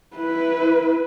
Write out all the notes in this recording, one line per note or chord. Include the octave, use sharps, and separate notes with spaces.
E4 B4